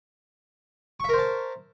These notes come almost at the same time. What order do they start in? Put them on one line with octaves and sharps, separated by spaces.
C#6 E5 A#4 C5 A5